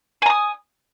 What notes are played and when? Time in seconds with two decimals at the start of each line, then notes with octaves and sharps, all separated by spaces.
0.22 G#5
0.26 A#5
0.30 D#6